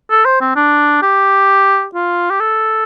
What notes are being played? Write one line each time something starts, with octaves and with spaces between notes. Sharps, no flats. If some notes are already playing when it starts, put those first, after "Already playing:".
A4
C5
C4
D4
G4
F4
G4
A4